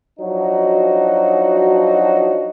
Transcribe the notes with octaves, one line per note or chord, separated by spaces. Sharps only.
F3 F#3 D4 D#4 F#4